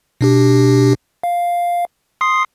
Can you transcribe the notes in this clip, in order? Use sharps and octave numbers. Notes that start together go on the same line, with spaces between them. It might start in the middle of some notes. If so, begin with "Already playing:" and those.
B2 D4 G4
F5
C6 D#6 C7